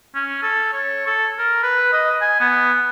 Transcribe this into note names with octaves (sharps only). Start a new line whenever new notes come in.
C#4
A4
C#5
A4
A#4
B4
D#5
G#5
B3